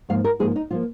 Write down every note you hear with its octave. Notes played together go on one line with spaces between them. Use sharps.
G#2 F3 A#3 F5
A#4
G#2 F3 A#3 G#4
D#4
F3 A#3 F4